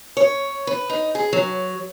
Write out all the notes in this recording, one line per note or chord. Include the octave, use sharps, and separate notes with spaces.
C#5
B4
D#4
G#4
F#3